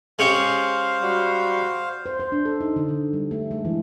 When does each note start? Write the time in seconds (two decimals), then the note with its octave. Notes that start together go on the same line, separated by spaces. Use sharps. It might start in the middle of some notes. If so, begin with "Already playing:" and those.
0.19 G#3 C#4 G4 C5 F5
1.02 G3 F#4
2.06 C5
2.20 C5
2.32 D4
2.45 A4
2.61 D#4
2.76 D3
2.89 D3
3.13 G3
3.31 A3
3.51 G#3
3.65 E3